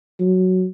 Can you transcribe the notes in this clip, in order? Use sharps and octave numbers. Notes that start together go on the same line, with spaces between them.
F#3